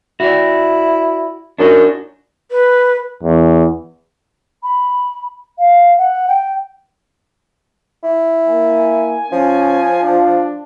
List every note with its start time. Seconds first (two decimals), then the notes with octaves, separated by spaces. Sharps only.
0.20 E4 F#4 D5
1.58 F#2 D4 D#4 F#4
2.51 B4
3.23 E2
4.63 B5
5.58 F5
5.97 F#5
6.27 G5
8.03 E4
8.48 A#3 G#5
9.32 F3 C#4
10.02 D4 F4